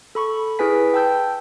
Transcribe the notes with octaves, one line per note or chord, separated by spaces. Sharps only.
A4 B5 C#6
E4 G#4 B4 G#5 B6
G5 A5 E6 G6